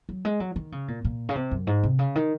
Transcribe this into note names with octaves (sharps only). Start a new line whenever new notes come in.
F#3
G#3
F#3
D#3
C#3
A#2
A#2
C#3
C3
F#2
G#2
C3
C#3
D#3